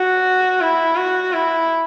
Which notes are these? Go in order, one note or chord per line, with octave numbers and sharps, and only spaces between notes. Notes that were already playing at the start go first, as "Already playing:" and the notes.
Already playing: F#4
E4
F#4
E4